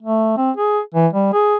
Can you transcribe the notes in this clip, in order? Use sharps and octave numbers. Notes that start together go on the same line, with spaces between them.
A3
C4
G#4
E3
G3
G#4